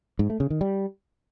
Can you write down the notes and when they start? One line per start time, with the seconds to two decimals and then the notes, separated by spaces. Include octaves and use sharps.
0.19 G#2
0.30 A3
0.40 C#3
0.50 D#3
0.61 G3